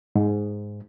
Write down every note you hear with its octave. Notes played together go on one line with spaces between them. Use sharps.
G#2